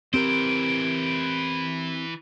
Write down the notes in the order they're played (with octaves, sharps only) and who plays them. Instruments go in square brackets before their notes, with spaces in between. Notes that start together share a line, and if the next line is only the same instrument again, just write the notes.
[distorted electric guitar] E3 C5 [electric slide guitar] C4 G4 A#4 [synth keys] D7